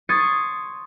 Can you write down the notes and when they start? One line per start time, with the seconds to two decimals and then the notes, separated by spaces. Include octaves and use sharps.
0.09 C6 C#6 D#6 G#6 A6 C#7